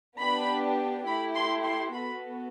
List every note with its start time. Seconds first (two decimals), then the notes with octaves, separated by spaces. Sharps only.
0.18 B3 D4 G4 B5
1.06 A3 E4 G4 B5
1.35 C6
1.64 C6
1.93 B3 F#4 A4 B5